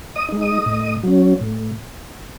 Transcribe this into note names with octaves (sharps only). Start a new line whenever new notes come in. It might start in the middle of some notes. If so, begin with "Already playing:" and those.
D#5 D#6
G#3 D#4
D#5 D#6
A2
F#3 C#4
A2